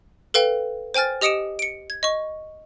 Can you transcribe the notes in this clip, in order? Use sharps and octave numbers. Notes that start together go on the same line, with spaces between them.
A4 B4 F5 G5
C5 G5 G#5 F6 A6
G4 D#5 D#6 C#7 D7 E7
C#7 D7
G#6
D#5 C#6